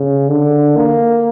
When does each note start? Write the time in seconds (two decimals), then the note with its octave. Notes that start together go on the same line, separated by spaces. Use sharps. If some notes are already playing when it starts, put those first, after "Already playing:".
Already playing: C#3
0.29 D3
0.77 A#3